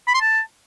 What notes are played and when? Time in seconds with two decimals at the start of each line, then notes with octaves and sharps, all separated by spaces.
0.07 B5
0.14 C6
0.21 A5